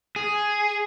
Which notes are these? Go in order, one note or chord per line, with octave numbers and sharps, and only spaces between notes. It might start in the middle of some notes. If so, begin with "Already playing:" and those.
G#4